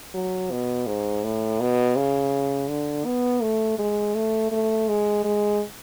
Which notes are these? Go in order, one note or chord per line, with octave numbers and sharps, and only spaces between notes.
F#3
B2
G#2
A2
B2
C#3
D3
B3
A3
G#3
A3
A3
G#3
G#3